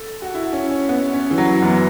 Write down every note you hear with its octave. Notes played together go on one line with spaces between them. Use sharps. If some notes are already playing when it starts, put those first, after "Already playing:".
Already playing: A4
F#4
E4
C#4
C#4
B3
C#4
E3
F#3
F#2 E3 B3